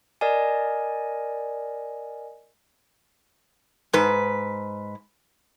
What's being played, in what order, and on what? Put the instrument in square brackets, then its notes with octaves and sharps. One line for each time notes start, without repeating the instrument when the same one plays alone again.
[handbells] A#4 D5 D#5 G#5
[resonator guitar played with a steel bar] G#2 B4